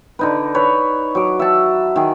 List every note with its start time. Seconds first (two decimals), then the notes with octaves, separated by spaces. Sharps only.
0.19 D3 D#4 B4
0.55 B4 C#5
1.15 F#3 D6
1.39 E5 F#5 A5
1.96 D#3 G#4